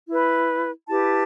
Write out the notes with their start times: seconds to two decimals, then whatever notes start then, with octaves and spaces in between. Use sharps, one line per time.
0.09 E4 B4
0.86 E4 G4 B4 A5